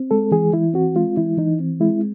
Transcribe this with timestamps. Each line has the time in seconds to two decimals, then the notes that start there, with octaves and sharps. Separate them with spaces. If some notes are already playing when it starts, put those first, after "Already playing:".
Already playing: C4
0.11 G#3 A4
0.32 E3 G#4
0.53 E3 E4
0.74 C4 F#4
0.96 G#3 F4
1.17 E3 E4
1.37 E3 D#4
1.60 C4
1.80 G#3 E4